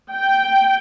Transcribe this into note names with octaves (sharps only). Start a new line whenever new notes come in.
G5